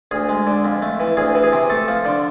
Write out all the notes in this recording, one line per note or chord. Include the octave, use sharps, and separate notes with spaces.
D2 G#4
G#3
D3
F2
A3
E3
D2 G#4
E3
G#4
C3
A3 A4
F3
D3